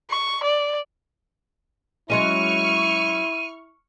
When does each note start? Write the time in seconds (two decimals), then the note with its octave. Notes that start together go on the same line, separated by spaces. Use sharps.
0.10 C#6
0.43 D5
2.10 F#3 G#3 C#4 E4 C#6 F6 D#7